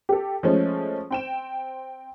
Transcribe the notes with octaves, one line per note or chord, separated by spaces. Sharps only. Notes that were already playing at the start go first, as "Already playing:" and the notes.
G4 A4
F3 G#3 A3 C#4
C4 G5 E7